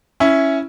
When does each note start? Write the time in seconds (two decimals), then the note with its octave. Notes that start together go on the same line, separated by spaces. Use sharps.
0.20 C#4 E4